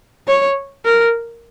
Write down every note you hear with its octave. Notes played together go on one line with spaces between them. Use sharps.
C#5
A#4